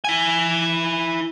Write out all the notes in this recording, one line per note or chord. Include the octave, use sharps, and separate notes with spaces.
E4 G#5